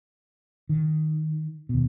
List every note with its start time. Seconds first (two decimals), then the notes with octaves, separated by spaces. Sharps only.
0.69 D#3
1.69 D#2 B2